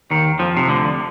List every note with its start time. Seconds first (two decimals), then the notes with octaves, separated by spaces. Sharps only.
0.11 D#2 D#3
0.39 F2 F3
0.57 C3
0.68 D2 D3